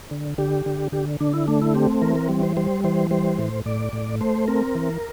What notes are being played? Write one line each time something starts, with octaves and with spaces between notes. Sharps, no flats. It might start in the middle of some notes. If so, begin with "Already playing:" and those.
D3
D3 G4
D3
D3 G4
D3 D4
E4
A3 D4
E4
C4 G4
E3 A#4
A#4
G3
C5
G3 C5
E3 C5
G3 C5
A2
A2 D5
A2
A3 C5
C4 A#4
E3